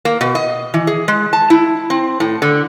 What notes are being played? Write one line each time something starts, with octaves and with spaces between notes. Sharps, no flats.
A#3
B2
D#5
E3
G#4
G#3
A5
E4
C4
A2
D3